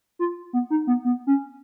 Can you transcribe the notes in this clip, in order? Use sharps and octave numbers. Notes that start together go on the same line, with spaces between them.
F4
B3
D#4
B3
B3
C#4